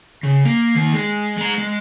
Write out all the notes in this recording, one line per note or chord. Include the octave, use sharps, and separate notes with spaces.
C#3
A#3
D#3 A#3
G#3
G#3 A#5
G#3